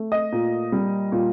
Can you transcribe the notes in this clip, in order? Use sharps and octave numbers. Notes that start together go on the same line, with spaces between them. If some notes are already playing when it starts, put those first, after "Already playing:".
Already playing: A3
D#5
A#2
G3
A#2